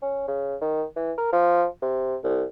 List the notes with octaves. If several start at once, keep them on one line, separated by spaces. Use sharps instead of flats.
C#4
C#3
D#3
E3
A#4
F3
C3
C2